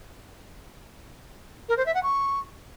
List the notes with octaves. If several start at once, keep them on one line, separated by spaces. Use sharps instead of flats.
A#4
C5
E5
F#5
C#6